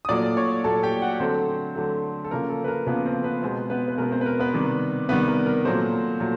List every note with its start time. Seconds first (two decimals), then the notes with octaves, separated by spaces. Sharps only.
0.05 D#6
0.09 A#2 F#3 A3 D5 D6
0.37 C#5 C#6
0.64 A#2 F#3 A3 A4 A5
0.83 G4 G5
1.02 F#4 F#5
1.20 D3 F#3 A3 C4 C5
1.76 D3 F#3 A3
2.24 A4
2.31 C#3 F3 A#3 A#4
2.50 A4
2.64 B4
2.68 A#4
2.87 C#3 F3 A#3 B3 B4
3.05 C4 C5
3.24 B3 B4
3.42 B2 G#3 B3 C4 C5
3.70 B3 B4
3.88 B4
3.98 B2 G#3 B3 A#4
4.12 C4 C5
4.21 B4
4.26 A#4
4.40 B3 B4
4.54 C3 D#3 G3
5.09 C3 D#3 G3 B3 B4
5.28 A#4
5.46 A#4
5.64 A#2 F#3 A3 C4 C5
6.20 A#2 F#3 A3